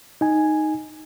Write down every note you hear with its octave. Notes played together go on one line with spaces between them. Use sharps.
D#4 G#5